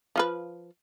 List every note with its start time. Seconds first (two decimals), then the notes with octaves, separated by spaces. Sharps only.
0.16 F3 F4 B4